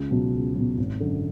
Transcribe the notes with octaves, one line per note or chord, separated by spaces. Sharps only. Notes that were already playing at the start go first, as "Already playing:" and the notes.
Already playing: C#2
B2 F#3
C#2
B2 F#3
G#1
F#2 D3